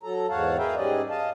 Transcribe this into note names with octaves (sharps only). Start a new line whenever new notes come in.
F#3 A4 A#5
E2 G#2 C#5 F5 F#5 A5
G#4 A#4 B4 E5 F5 G5
G#2 G3 C#4 G#4 D5 D#5
D#5 F5 A5